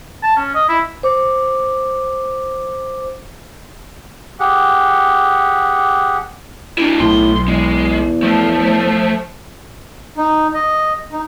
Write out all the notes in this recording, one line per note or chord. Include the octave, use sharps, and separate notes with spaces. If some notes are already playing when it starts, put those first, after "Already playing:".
A5
C#4
D#5
E4
C5 D6
G4 G#4 F#5
D4 E4
B1 A2 C6
E2 G#3
F3 A3
D#4
D#5
D#4